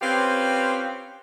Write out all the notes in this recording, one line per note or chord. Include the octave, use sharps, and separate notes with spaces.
C4 C#4 F4 G4 B4